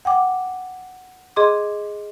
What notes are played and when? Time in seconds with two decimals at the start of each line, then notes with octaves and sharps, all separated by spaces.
0.05 F#5 G5 D6
1.36 G#4 D#5 C6 D6